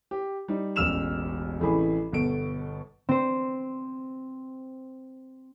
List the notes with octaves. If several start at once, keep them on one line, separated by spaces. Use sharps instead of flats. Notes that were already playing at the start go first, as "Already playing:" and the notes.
G4
G3 D#4
E1 A1 E6 F6 E7 F7
A1 A2 C3 E3 G#4 B5
G1 B2 A4 D7
C4 C5